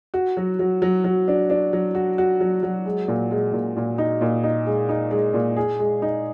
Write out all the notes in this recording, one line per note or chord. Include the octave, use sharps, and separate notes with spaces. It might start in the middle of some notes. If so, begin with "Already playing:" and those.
F#4
F#3
F#3
F#3
F#3
D4
D4
F#3
F#4
F#4
F#3
F#3
G#3
A#2
G#3
A#2
A#2
D#4
A#2
D#4
G#3
D#4
G#3
A#2
G#4
G#3
D#4